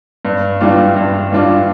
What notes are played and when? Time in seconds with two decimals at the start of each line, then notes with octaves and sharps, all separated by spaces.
0.25 G2
0.61 E3 G3 D4 F4
0.96 G2
1.32 E3 G3 D4 F4